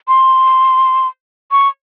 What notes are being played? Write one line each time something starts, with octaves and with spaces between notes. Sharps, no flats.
C6
C#6